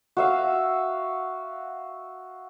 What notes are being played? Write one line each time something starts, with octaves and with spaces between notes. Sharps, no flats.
F#4 E5 F5